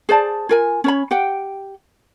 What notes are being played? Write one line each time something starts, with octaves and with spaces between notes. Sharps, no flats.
G#4 C5 D5 A5
F4 A#4 G#5
C#4 C#5 B5
G4 F#5 G5